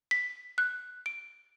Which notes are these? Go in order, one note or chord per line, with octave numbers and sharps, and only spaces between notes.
B6
F#6
D7